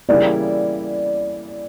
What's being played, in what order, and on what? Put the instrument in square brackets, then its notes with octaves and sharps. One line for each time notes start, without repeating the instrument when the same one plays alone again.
[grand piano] C#3 E3 G3 A#3 E4 [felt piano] D5